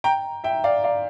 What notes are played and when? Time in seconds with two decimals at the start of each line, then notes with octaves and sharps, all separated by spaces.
0.04 G5 A#5
0.44 E5 G5
0.64 D5 F5
0.84 D5 F5